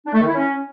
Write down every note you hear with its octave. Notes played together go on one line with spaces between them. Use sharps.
D4
A3
D#3
E4
C#4